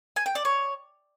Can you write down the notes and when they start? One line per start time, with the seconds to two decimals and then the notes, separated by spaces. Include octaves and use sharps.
0.16 G#5
0.26 G5
0.35 D5
0.45 C#5